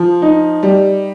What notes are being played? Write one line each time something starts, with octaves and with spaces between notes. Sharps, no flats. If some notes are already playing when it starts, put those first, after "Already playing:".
Already playing: F3
D#4
G3